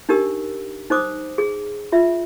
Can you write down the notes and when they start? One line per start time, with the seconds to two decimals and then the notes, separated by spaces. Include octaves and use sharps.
0.09 D4 D#4 G4 A#4 E6
0.90 D#4 C5 D6 D#6
1.38 G#4
1.92 F4 E5